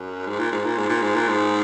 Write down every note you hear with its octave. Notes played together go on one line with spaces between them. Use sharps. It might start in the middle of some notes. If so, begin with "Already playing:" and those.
Already playing: F#2
G#2
A#2
G#2
A#2
G#2
A#2
G#2
A#2
G#2